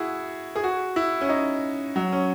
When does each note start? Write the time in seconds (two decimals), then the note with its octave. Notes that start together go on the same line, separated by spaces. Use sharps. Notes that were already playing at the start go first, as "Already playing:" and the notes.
Already playing: E4 F#4 G#4
0.56 G#4
0.63 F#4
0.96 E4
1.21 C#4
1.29 D#4
1.96 F#3
2.12 C#4